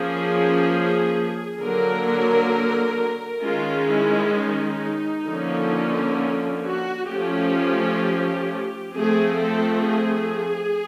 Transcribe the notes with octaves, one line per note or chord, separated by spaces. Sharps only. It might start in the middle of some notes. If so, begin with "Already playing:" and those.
Already playing: F3 A#3 C#4 G#4
D3 F#3 A#3 A#4
D#3 G#3 C#4 F4
E4
D#4
D3 F3 A#3 C#4
F#4
F3 A3 C#4 G4
F3 A3 C4 G#4
A4
G#4